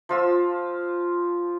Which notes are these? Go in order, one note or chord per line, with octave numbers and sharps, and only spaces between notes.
F3 F4 E6